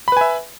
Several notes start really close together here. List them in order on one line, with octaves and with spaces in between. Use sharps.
B5 B4 G#5 E5